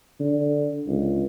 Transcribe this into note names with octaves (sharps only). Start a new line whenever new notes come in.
D3
C#2